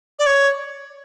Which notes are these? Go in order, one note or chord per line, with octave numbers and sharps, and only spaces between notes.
D5
C#5